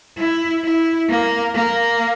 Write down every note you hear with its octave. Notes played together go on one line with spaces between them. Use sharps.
E4
E4
A#3
A#3